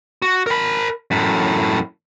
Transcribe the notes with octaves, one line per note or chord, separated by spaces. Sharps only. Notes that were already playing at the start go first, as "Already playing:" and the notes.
F#4
A#4 B5
F#2 A2